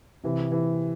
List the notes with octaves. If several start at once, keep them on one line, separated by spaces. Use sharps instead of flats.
C3 E3
E3